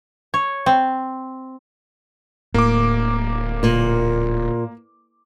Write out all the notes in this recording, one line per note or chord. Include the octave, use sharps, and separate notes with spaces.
C#5
C4
D1 A2 A#3 D6
A#2